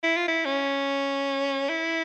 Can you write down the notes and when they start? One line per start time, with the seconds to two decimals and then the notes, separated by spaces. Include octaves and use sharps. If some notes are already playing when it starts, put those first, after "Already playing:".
0.03 E4
0.16 F4
0.28 E4
0.45 C#4
1.69 E4